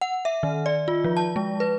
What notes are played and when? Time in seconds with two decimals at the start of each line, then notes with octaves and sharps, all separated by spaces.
0.01 F#5
0.25 E5
0.43 D#3
0.66 D5
0.88 F4
1.04 F3
1.17 A5
1.36 G#3
1.60 B4